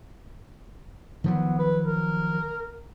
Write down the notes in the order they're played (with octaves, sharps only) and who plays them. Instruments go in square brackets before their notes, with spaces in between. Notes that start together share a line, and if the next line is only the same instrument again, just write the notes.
[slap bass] D#3 F3 F#3 [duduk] B3
[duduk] B4
A#4